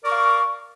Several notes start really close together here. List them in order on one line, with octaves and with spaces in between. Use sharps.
A#4 D5 C#6 F5